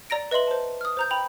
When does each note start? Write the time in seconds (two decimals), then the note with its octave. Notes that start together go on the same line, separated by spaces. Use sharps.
0.10 D5 A#5 A#6 D7
0.31 B4 D#5 E5 C6 F#7
0.48 C5 A5
0.81 D#6 F6
0.97 C5 A#5 G6
1.11 G5 B5 F7